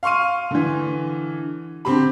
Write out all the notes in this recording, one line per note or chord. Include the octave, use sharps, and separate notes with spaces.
F5 C6 C#6 F6 D#7
D3 E3
D3 C4 G4 B5